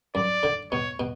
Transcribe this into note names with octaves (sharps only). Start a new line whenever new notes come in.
F#2 D5
D3
B2 C#5
B2